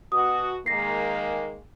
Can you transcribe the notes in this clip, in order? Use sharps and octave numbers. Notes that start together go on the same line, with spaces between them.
B2 F#4 D#6
D#3 G#3 A#3 A#6 C7